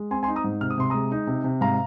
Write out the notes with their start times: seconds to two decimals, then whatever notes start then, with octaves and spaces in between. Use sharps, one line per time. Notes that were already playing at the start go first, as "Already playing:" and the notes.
Already playing: G#3
0.11 C4 G#5 C6
0.23 G#5 C6
0.28 D#4
0.36 A#5 D#6
0.44 G#2
0.61 C3 F6
0.70 D#6
0.78 C3 C6
0.90 G#3 A#5 D#6
1.12 D#4
1.27 C3
1.44 C3
1.61 G#2 F5 A#5